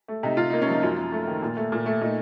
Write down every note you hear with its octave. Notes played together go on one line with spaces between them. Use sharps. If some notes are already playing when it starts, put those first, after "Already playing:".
A3
C3 D#4
C3 F4
A#3 D#4
C#4
F3 D#4
F#2 F4
F#2
A3
D#3
A#2
A3
A#2
A3
A#2 D#4